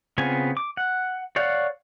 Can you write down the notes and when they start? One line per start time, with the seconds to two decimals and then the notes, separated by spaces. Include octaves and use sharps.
0.18 C#3 B3 C4 F4 G#5
0.57 D6
0.77 F#5
1.36 C#5 D5 F5 F#5